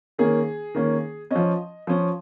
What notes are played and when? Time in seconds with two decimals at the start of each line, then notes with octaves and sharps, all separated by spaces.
0.19 D#3 A#3 C#4 G#4
0.75 D#3 A#3 C#4
1.31 F3 C#4 D#5
1.87 F3 C#4